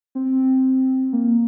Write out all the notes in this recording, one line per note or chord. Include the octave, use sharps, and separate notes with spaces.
C4
A#3